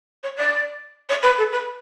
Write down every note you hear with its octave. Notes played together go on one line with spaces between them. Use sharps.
C#5
D5
C#5
B4
A4
B4